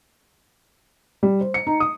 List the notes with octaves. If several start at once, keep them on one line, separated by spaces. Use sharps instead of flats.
G3
C5
C#7
D#4
D#6